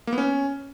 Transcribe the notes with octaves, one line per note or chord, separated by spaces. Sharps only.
A#3
B3
C#4